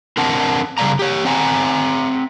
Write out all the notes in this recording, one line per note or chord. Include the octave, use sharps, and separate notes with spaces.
C4 D4 A#4 C5 F#5 A5
C#3 G3 A#3 D5 F5 A#5
G4 C#5
C4 C5 F#5 G#5 A#5